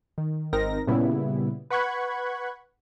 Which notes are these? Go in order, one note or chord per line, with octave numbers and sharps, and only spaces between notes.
D#3
G#1 C4 D#4 A#4 A#6
A#2 C#3 G3 B3 E4
B4 F#5 B5 C#6 F#6 G#6